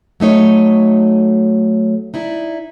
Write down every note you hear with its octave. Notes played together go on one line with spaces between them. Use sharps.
F#3 A3 D#4 C#5
D#4 E4 D5